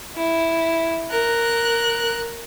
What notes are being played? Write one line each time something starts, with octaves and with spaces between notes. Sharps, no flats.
E4
A#4 F#6